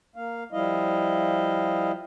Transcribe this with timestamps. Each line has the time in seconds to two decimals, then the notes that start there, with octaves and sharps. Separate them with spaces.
0.16 A#3 F5
0.52 F3 G3 E4 D#5 F5